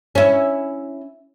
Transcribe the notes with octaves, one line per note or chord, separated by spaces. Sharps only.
C#4 E4